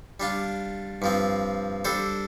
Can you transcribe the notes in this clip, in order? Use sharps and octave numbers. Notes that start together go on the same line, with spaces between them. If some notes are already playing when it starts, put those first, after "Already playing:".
G3 D4 F4
G2 F3 C4
G3 D4 A4 C5